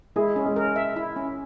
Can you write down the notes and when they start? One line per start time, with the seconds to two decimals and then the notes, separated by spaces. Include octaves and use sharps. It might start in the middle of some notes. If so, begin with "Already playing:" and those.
0.16 G#3 E4 G#4
0.36 C#4
0.46 G#3 G#4
0.56 A#4
0.76 E5
0.96 E4
1.16 C#4